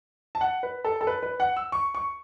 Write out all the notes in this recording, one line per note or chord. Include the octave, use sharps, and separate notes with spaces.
A5
F#5
B4
A4
A4
B4
B4
F#5
E6
C#6
C#6